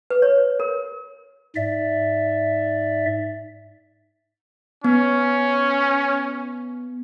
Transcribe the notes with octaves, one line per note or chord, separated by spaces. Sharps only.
B4
C#5
A#4
G#2 D5 E5
B3 C#4